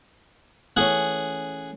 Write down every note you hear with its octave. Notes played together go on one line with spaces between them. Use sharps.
E3 A3 C#4 G#4 F#5